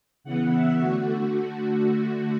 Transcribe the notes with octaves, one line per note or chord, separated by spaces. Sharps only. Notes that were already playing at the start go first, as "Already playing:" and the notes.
C#3 E3 B3 F#5
E5
D3 A3 F#4